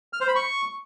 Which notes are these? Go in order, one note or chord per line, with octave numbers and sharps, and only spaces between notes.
F6
C5
B5
C#6